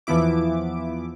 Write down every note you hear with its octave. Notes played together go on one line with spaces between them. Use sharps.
E2 E3 F3 B3 E4 D6